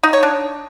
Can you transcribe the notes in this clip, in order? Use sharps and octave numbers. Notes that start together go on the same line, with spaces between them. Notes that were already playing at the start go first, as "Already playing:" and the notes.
D#4
C#5
D4